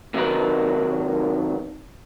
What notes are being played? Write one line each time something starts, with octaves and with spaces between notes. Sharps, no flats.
C3 D#3 F#3 D#4 A#4 B4